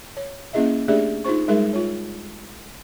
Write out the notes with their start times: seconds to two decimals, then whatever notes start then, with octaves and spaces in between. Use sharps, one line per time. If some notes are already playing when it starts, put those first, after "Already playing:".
0.17 C#5
0.53 A#3 C#4 E4 G#4 D#5 E5
0.88 A3 D4 G4 G#4 D5 E5
1.24 D#4 F4 G#4 C5 C#6
1.48 G3 G#3 D#4 G#4 A#4 E5
1.73 F4 C#5